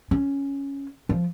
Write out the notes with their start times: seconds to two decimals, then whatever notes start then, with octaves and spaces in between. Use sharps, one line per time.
0.11 C#4
1.09 F3